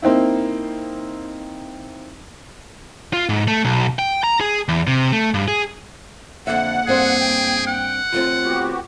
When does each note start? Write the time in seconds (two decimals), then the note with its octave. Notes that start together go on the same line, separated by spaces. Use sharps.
0.02 A#3 C4 D#4 E4
3.13 F4
3.29 G#2
3.48 A3
3.65 B1
3.99 G5
4.24 A#5
4.41 G#4
4.69 E2
4.87 C3
5.12 A3
5.34 G2
5.48 G#4
6.47 F2 D3 A#3 E5 F#5
6.87 G2 C4 G#4 C5
7.20 G5
7.67 F#5
8.12 D#2 A3 C4 F4
8.45 B3 F#4 G4